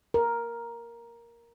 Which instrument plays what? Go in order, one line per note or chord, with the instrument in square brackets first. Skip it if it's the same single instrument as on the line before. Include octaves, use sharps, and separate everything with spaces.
[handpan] A#4